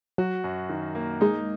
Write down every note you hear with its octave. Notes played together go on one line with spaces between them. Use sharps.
F#3 F#4
F#2
D#3
A#3
G#3 D#4